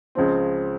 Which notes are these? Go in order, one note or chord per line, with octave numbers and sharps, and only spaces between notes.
C#2 C#3 F3 C4